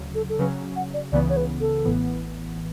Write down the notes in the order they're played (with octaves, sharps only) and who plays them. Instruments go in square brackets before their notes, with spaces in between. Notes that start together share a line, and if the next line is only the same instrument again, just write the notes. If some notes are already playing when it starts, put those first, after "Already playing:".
Already playing: [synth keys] D2 C#3 F#3
[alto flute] A4
A4
[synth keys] C#3 F#3 C#4 [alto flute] B4
[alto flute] F#5
D5
[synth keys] C#2 C#3 E3 B3 [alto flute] D5
[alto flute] C#5
B4
A4
[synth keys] A1 A2 E3 B3